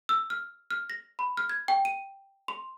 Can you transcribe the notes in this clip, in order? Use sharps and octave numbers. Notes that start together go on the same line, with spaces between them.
E6
F6
F6
A#6
B5
F6
G#6
G5
D#7
C6